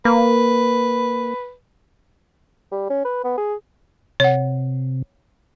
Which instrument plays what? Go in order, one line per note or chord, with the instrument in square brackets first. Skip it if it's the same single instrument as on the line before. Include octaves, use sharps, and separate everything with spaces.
[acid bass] A#3 [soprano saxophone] B4
[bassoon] G3
C#4
B4
B3
G#4
[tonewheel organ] C3 [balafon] C#5 F#5